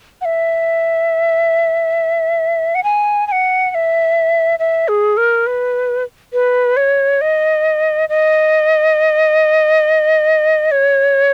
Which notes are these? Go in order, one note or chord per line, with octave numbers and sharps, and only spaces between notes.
F#5
E5
F#5
G#5
G#5
F#5
F#5
E5
E5
G#4
A#4
B4
B4
C#5
D#5
D#5
C#5